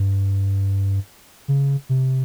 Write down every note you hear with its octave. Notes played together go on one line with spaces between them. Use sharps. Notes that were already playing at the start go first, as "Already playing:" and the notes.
Already playing: G2
C#3
C3